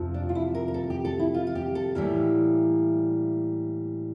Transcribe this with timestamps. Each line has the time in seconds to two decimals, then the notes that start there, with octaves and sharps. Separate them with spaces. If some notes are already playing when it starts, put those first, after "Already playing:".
Already playing: F2 C3 F3
0.14 D4
0.29 F4
0.35 E4
0.55 A#4
0.68 A#4
0.74 A4
0.90 G4
1.05 A4
1.19 E4
1.34 F4
1.47 F4
1.55 G4
1.75 A4
1.95 A2 E3 G3 A#3